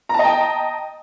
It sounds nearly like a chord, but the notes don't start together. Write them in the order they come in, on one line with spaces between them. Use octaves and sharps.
A#5 A5 D#5 G5